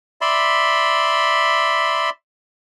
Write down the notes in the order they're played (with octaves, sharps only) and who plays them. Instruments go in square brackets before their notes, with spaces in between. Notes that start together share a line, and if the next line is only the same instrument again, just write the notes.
[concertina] D5 E5 B5 C6